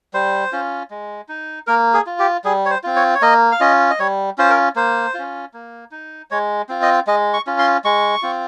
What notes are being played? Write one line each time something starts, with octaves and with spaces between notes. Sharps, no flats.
G3 C5
C#4 F4
G#3
D#4
A#3 A#4
G#4
F4
G4
G3 G#4
C#5
C5
C4 F4
C#5
C#5
A#3 D#5
F5
C#4 F4 D#5
D#5
G3 C#5
C#4 F4 C5
A#4
A#3 C5
C#4 F4
A#3
D#4
G#3 C#5
C4 F4
D#5
G#3 D#5
C#6
C#4 F4
C6
G#3 C#6
C4 F4